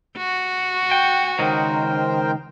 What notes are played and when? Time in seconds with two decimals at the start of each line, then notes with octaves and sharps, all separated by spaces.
0.17 F#4
0.91 G5
1.39 C#2 D#3 A#4 C5 G5